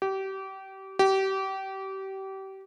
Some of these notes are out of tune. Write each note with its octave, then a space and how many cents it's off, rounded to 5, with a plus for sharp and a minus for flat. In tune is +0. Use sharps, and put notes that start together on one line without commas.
G4 -30
G4 -30